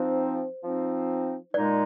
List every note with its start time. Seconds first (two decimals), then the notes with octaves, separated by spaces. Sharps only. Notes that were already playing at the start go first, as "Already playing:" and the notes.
Already playing: F3 C4 D#4 C5
0.63 F3 C4 D#4
1.54 A#2 G#3 D#4 D5